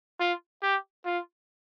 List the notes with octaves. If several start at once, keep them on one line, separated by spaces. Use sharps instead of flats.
F4
G4
F4